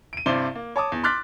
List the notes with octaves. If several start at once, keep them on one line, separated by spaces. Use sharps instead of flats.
D7 D#7
G2 C3 E4 C5 D5 G7
A#3
C#5 A5 D6 D#6
E2
C6 D6 F6 F#6 A6 B6